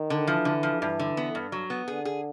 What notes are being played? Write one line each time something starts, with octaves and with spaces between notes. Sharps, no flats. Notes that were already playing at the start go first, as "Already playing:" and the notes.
Already playing: D#3
D3
E3 F3
D3
F3
G2 E3
D3
B3
G2
F#3
B3
D3 G#4
G#4